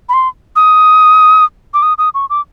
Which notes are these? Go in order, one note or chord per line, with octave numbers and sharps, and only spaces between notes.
B5
C6
D#6
D6
D#6
D#6
C#6
D6